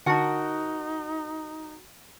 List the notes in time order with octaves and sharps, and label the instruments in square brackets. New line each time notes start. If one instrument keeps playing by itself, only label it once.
[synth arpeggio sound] D3 A5 [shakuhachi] D#4 [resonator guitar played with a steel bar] F#4 A#4 F#5